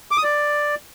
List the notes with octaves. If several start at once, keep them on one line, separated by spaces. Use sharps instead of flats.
D6
D#6
D5